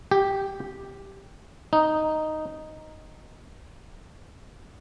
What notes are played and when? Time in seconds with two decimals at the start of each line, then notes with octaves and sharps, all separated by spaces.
0.11 G4
1.73 D#4